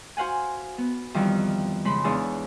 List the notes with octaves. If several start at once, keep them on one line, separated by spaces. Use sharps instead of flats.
F#4 C5 F5 F#5 G#5
B3
F2 D#3 E3 G3 F5
C#3 G#3 B5 C6
E2 G#3 D4 C#5 F5 D#6